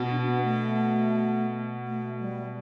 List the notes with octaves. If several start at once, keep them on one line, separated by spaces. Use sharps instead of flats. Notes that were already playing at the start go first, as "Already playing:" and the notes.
Already playing: B2
D4
B3
A3
A3
G3